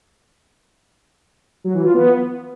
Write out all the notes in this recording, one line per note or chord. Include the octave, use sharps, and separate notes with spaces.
F#3
E3
F4
B3